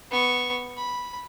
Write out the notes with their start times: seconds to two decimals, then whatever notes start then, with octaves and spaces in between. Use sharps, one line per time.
0.11 B3 C#6
0.77 B5